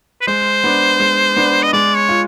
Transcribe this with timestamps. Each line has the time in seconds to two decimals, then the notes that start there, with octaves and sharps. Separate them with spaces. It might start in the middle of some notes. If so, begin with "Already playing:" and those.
0.21 B4
0.27 G#3 C5
0.64 B3 D4
1.00 G#3
1.37 B3 D4
1.63 D#5
1.73 G#3 D5
1.96 C#5
2.09 F4